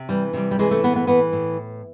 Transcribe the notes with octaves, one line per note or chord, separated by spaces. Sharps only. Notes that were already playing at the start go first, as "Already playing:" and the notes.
Already playing: C3
E3 G3
C3 G3
G3
E3 G#3
A3
A2 B3
B3
E3 B3
A2